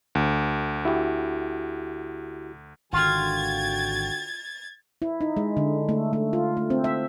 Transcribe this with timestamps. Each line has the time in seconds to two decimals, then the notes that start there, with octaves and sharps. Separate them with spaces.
0.15 D2
0.85 E4 F#4 G4
2.93 G#1 D3 D#3 F4 F#4 G5 G#6 A6
5.02 E4
5.21 D#4
5.37 G#3
5.57 D3
5.89 A3
6.13 A3
6.33 F4
6.57 A3
6.70 C4
6.84 E5